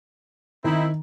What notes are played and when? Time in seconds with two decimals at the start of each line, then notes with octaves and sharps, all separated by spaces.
0.64 D#3 C4 D#4 E4